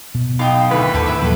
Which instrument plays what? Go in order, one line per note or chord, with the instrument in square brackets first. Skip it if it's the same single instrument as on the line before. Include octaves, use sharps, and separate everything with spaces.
[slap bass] B2
[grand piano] B1 [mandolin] F5 G5 D#6
[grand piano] G#1 D2 A2 [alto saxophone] B4
[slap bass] D#2 [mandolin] G4 A4 G#5
[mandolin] E4 E5 E6
[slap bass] A#2 F3 F#3 [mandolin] A4 B4